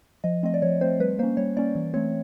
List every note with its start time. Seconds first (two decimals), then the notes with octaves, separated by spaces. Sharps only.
0.24 F3 D#5
0.43 A3 C4 D#5
0.54 D5
0.62 F3 C#5
0.81 A3 C4 C5
1.00 G3 B4
1.19 A#3 C5
1.23 C#4
1.37 G3 C#5
1.57 A#3 C#4 D5
1.75 E3
1.94 A3 C4 C#5